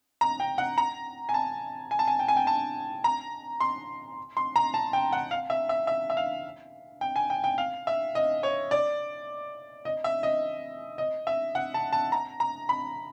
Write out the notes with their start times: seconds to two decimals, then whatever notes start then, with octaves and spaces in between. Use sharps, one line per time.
0.21 A#5
0.40 G5
0.58 F#5
0.78 A#5
1.29 G#5
1.34 A5
1.91 G#5
1.99 A5
2.07 G#5
2.19 G5
2.28 G#5
2.37 G5
2.47 A5
3.04 A#5
3.60 C6
4.37 C6
4.56 A#5
4.74 A5
4.93 G5
5.13 F#5
5.31 F5
5.50 E5
5.69 E5
5.87 E5
6.10 E5
6.17 F5
7.01 G5
7.16 G#5
7.30 G5
7.44 G5
7.58 F5
7.87 E5
8.15 D#5
8.43 C#5
8.71 D5
9.85 D#5
10.04 E5
10.23 D#5
10.98 D#5
11.27 E5
11.55 F#5
11.74 A5
11.93 A5
12.12 A#5
12.40 A#5
12.69 B5